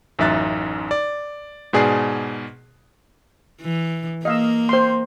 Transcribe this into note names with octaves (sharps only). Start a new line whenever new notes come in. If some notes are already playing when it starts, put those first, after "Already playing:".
A1 F#2 D#4 E5 F#6 A6
D5
G#2 B2 G#4 D5 F#6 C7
E3
A#3 D#5 F5 E6
C5 C6